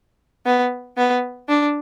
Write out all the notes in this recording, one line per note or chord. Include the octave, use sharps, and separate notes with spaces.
B3
B3
D4